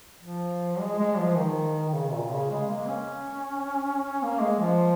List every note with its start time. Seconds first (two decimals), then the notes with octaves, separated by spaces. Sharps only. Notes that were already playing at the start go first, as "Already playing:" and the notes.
0.22 F3
0.80 G#3
0.99 G#3
1.18 F3
1.37 D#3
1.89 D#3
1.94 C#3
2.13 A#2
2.31 C#3
2.51 G#3
2.70 A#3
2.89 C#4
4.22 A#3
4.41 G#3
4.60 F3